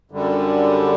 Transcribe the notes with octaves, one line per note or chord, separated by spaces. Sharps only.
F#2 D3 G3